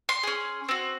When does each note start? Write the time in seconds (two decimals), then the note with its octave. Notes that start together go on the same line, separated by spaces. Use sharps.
0.09 C6
0.23 C#4 G#4
0.69 C4 F#4